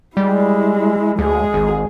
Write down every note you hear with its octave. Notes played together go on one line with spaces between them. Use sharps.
G3 G#3 E4
D2 G#3 G#4
G#1